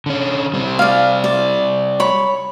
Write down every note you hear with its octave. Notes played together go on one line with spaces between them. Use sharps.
D3 C#4
G3 C4
D5 F5
D5
C#5 B5